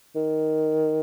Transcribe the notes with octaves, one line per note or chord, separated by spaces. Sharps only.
D#3